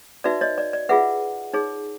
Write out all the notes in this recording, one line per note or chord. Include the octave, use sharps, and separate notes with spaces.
D#4 F#4 B4 D5 E5
C#5 D#5
D5
D5
F4 G#4 B4 E5 F#5
D#4 G#4 C#5